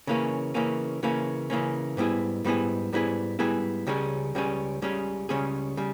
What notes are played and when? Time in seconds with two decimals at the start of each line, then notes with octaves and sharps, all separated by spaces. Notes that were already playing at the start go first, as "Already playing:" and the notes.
0.07 C#3 E3 A#3 C#4
0.54 C#3 E3 A#3 C#4
1.03 C#3 E3 A#3 C#4
1.50 C#3 E3 A#3 C#4
1.97 G#2 G3 B3 E4 G#4
2.44 G#2 G3 B3 E4 G#4
2.93 G#2 G3 B3 E4 G#4
3.39 G#2 G3 B3 E4 G#4
3.87 C#2 C#3 G3 C#4 G#4
4.35 C#2 C#3 G3 C#4 G#4
4.82 C#2 C#3 G3 C#4 G#4
5.29 C#2 C#3 G3 C#4 G#4
5.77 C#3 G3